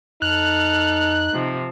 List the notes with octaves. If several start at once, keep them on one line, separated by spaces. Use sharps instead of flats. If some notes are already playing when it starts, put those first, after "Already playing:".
F2 D#4 A4 F6 F#6
C3 F3